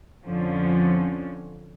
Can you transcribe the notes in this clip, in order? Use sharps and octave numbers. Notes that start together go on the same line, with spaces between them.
F2 D3 F3 C#4